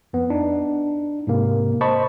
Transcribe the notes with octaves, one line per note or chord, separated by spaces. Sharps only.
F2 B3
D4 D#4
G#2 C3 A#3
C5 D#5 A5 B5 C#6